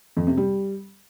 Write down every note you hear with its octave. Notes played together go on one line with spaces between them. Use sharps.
F2
C3
G3